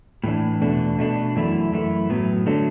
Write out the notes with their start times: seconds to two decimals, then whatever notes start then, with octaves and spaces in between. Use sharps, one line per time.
0.24 A2 E3 D4
0.61 E2 B2 A3 D4
0.98 B2 A3 D4
1.35 F#2 E3 A3 E4
1.72 F#2 E3 A3 E4
2.10 A2 F#3 B3
2.46 D3 F#3 A3 D4